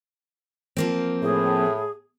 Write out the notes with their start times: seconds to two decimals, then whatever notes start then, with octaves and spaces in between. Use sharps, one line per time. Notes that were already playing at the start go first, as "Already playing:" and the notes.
0.77 F3 A#3 C4
1.23 A2 G#4